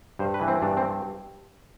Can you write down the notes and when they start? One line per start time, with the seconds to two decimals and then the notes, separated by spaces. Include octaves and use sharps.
0.19 G2 C5
0.34 B4
0.41 E3
0.48 C4
0.62 G2 D4
0.77 C4